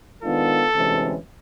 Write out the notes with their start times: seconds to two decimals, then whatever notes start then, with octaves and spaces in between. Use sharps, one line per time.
0.23 D#3 G#3 B3 D4 F4 A4
0.74 D2 C3 E3 G#3 C#4